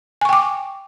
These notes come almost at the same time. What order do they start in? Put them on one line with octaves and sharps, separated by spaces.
G#5 C#6 G5 D6